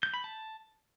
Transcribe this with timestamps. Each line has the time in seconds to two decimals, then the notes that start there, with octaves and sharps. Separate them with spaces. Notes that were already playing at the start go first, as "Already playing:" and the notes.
0.03 G6
0.14 B5
0.24 A5